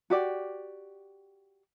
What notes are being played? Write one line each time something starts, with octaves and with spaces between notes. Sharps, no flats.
F#4 G4 D5